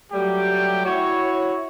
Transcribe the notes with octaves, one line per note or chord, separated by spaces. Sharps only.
F#3 G3 A3 G4
E4 F#4 C#5